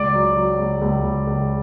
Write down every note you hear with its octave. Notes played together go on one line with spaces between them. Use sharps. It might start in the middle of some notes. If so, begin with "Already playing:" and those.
Already playing: C#2 D5 D6
F#3
F#3
C#2
C#2
C#2
C#2